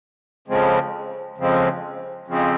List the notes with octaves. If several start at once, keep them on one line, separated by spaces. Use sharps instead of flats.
F2 C#3 F3 G#3 C4
F2 C#3 F3 G#3 C4
F2 C#3 F3 G#3 C4